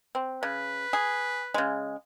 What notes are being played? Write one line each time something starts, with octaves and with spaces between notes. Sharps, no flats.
C4
C#3 B4
G#4
C#3 G#3